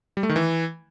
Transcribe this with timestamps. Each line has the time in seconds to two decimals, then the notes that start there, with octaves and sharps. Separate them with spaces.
0.17 G3
0.23 A3
0.29 D#3
0.36 E3